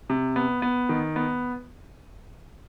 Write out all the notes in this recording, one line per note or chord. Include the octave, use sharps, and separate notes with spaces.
C3
B3
B3
D#3
B3